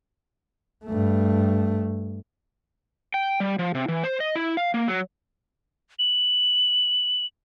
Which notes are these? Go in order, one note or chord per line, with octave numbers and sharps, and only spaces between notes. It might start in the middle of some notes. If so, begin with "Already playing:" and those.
G2 A3
G5
G3
F3
C3
E3
C5
D#5
E4
F5
A#3
F#3
F#7